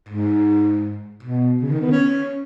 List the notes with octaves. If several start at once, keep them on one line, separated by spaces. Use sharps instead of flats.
G#2
B2
C#3
D#3
B3
C#4